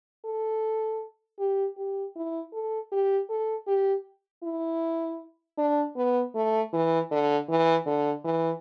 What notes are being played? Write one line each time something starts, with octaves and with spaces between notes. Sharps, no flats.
A4
G4
G4
E4
A4
G4
A4
G4
E4
D4
B3
A3
E3
D3
E3
D3
E3